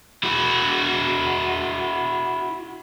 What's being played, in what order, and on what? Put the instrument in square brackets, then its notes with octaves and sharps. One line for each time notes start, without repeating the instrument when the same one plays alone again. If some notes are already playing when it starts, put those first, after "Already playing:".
[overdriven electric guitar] E4 F#4